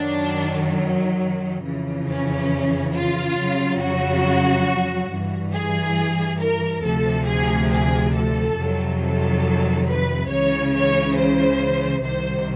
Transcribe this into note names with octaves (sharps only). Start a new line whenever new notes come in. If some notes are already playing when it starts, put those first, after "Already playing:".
Already playing: F#2 D#3 F#3 D4
F2 C#3 E3
C#4
F4
F2 C#3 F#3
F#4
G2 E3
G#4
A#4
D2 C3 F3 A4
G#4
G#4
A4
F2 C3 D#3 F#3
A4
B4
C#2 C#3 E3 C#5
C#5
C5
C2 C3 D#3 C5